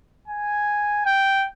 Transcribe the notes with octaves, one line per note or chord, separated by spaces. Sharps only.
G#5
G5